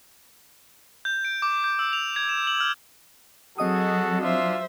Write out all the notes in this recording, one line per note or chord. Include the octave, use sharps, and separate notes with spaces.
G6
D7
D6
G6
E6
F7
G#6
E7
F#7
F6
F#3 C4 F#4 G#4 A4 D#5 D#6
D4 F4 C5 E5